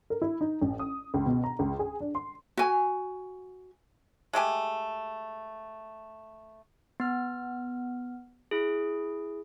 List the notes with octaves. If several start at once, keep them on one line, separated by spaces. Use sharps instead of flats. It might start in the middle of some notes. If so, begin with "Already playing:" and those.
A#4
E4
D#4
A1
D#6
C#2
B2
A#5
C#2
G#4
D4
C6
F#4 G#5
G#3 A3 G4 G#5
B3 F6
E4 G#4